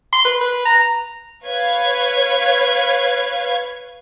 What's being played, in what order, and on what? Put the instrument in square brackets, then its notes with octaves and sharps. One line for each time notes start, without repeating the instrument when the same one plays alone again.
[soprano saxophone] C6
B4
B4
A#5
[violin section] B4 C#5 F5 G#6